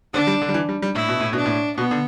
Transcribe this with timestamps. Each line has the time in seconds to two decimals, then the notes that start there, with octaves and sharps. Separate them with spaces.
0.14 D3 D4
0.27 G3
0.42 D3
0.49 G3
0.54 E3
0.69 G3
0.82 G3
0.95 A2 E4
1.09 B2
1.20 A2
1.33 B2 D4
1.46 A2
1.78 B2 B3
1.91 D3